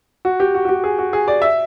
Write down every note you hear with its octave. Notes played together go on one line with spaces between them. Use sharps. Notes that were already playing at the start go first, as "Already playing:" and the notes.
F#4
G4
F#4
F#4
G4
G#4
F#4
G#4
D5
E5